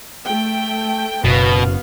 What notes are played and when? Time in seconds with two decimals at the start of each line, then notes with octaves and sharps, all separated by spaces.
0.25 A3 G5
1.25 F#1 B2 B3 F#4 F5